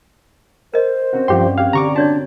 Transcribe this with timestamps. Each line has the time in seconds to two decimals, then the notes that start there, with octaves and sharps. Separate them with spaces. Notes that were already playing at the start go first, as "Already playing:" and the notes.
0.74 A#4 C5 D#5
1.13 C4 C#4 F#4
1.28 G2 F3 G4 G5 C6
1.58 G4 F5 F#6 G#6
1.73 D3 G4 A#5 C#6 D6
1.96 D4 F#4 C#5 D5 A5 D7